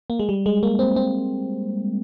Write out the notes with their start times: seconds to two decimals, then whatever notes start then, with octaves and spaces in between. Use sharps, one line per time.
0.10 A#3
0.19 G#3
0.29 G3
0.46 G#3
0.63 A#3
0.79 C4
0.96 C4